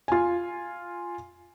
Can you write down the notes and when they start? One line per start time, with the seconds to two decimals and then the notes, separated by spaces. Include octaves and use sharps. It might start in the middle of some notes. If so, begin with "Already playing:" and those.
0.08 F4 G#5